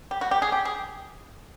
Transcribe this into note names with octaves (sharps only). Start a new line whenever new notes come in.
G4
F#4
G4
G#4
G4
G#4